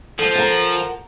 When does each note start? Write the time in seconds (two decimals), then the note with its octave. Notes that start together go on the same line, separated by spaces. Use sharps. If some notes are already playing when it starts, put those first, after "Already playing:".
0.19 F3 A4
0.35 A#4 F#5